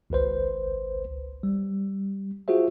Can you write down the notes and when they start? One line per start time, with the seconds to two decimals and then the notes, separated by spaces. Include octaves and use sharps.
0.10 G#1 C#2 B4 C5
1.43 G3
2.48 F4 F#4 G#4 C5 E5